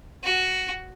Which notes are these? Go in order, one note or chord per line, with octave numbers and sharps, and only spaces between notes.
F#4